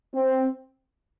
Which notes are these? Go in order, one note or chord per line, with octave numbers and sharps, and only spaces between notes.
C4